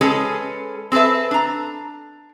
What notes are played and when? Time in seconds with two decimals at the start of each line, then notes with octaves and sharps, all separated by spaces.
0.01 G#3 C#4 G#4 A4 B4
0.92 C4 G#4 A4 B4 E5
1.31 D4 A#5